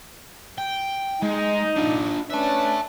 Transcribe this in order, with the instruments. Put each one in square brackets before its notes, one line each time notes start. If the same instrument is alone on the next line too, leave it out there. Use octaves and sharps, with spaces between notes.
[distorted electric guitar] G5
[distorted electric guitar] G#3 [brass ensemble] D#4
[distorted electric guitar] D4 F4
[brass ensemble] C#4 D4 B4 [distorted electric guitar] E5 A5